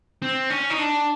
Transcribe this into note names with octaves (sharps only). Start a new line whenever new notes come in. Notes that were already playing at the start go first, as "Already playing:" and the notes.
C4
C#4
D#4
D4